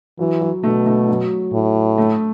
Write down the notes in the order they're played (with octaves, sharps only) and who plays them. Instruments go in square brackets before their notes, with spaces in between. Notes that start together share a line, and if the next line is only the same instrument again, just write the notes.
[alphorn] E3 [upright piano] F#3
[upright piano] F#3
[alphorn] B2 [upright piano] A3
[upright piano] A3
F#3
[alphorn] A2
[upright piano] A3